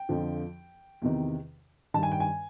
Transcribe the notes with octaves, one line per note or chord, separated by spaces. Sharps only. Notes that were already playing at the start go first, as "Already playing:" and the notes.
Already playing: G5
F2 D3 F3
E2 C3 D#3
G2 D#3 A5
G#5
G5
G#5